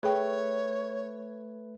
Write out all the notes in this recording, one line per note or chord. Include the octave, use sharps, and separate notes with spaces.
A3 G#4 B4 C#5 G5